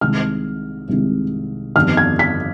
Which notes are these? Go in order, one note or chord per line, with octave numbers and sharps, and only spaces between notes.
C2 C3 D#3 G#3 F6
C2 C3 D#3 G#3
G1 F2 D#3 G3 F6
G#6
B6